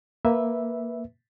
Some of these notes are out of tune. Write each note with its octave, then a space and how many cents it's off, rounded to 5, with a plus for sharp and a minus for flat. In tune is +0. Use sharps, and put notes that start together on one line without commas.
A#3 +0 B4 -5 E5 +0